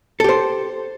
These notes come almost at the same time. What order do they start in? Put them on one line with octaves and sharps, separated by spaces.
A4 G4 C5